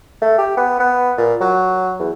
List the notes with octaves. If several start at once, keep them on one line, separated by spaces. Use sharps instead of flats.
A3
G4
B3
B3
A#2
F#3
E2